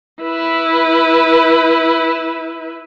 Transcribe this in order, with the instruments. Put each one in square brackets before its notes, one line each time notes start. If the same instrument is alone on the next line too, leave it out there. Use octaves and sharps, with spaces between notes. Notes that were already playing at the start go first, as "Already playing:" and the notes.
[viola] E4 B4